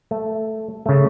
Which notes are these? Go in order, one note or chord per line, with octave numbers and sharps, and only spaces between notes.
A3
C#3 A3